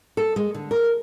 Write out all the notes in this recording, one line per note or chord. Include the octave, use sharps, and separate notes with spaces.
A4
G#3
D3
A#4